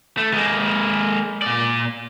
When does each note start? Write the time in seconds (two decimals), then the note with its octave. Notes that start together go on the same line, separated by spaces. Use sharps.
0.17 A3
0.33 G#3 A#3
1.42 A#2 D5